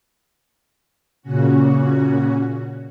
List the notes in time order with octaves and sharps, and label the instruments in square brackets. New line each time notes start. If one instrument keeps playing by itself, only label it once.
[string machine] A#2 C#3 C#4 F#4